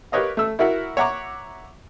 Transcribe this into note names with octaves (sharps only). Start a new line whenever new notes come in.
G4 A#4 B4 C#5 D#5 F5
A3 E6
E4 F#4 A#4 E5 F#5
C#5 E5 F#5 A#5 D6